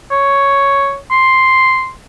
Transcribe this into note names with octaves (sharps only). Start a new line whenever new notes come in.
C#5
C6